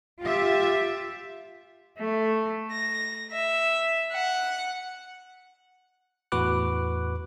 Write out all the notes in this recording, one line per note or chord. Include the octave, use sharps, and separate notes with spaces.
F4 G4 E5
A3
A#6
E5
F#5
E2 A2 F#4 B4 D6 F#6